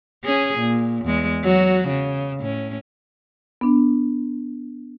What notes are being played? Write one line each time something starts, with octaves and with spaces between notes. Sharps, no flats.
C#4 G#4
A#2
E2 G#3
F#3 F#4
C#3
A2 C#4
B3 D4